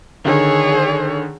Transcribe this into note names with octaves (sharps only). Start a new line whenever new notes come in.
D3 D#3 G#4 C#5